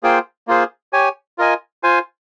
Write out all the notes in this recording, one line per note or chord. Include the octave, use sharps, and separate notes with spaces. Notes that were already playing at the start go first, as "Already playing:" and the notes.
A#3 F4 G#4 C5 G5
A#3 F4 G#4 C5
G4 C#5 G#5
F4 A#4 D#5 G#5
F4 C5 F5 G#5